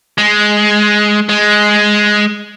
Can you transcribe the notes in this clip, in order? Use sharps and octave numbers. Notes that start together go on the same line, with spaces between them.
G#3
G#3